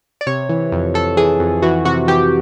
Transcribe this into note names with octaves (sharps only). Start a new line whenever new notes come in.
D5
C3 C#5
E3
F2
F2 A4
E3 G#4
F2
E3 F#4
C3 F#4
E3 G4